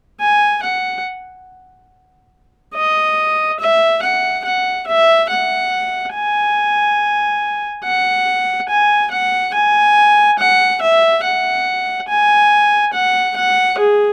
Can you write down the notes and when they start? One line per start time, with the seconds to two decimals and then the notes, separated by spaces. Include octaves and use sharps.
0.20 G#5
0.63 F#5
2.75 D#5
3.60 E5
4.02 F#5
4.45 F#5
4.87 E5
5.30 F#5
6.14 G#5
7.84 F#5
8.69 G#5
9.11 F#5
9.54 G#5
10.39 F#5
10.82 E5
11.24 F#5
12.08 G#5
12.93 F#5
13.36 F#5
13.78 G#4